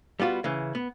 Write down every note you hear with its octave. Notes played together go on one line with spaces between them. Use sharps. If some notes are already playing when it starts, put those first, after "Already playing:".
G3 B3 F4 F#4
C#3 E3
B3